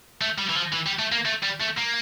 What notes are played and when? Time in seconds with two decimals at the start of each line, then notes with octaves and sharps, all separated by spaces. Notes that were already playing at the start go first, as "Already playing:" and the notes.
0.21 A3
0.38 G3
0.50 E3
0.56 F3
0.73 E3
0.87 G3
0.99 A3
1.12 A#3
1.25 A3
1.43 G3
1.60 A3
1.77 A#3